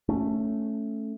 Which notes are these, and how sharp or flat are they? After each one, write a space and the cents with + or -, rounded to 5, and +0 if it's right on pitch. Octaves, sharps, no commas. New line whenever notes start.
A3 +0 C#4 +0